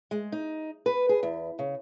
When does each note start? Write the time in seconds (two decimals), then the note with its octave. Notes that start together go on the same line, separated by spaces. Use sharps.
0.11 G#3
0.32 D#4
0.86 B4
1.09 G#4
1.23 E2
1.59 C#3